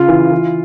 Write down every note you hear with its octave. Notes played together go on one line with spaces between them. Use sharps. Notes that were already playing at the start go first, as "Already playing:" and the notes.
Already playing: C#3 F4
E3
E3